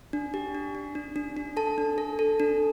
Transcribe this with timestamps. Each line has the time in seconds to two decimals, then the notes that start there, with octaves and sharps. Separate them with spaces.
0.13 D4
0.34 G4
0.55 D4
0.75 D4
0.95 D4
1.16 D4
1.37 D4
1.57 A4 A5
1.78 D4
1.98 A4
2.19 A4
2.40 D4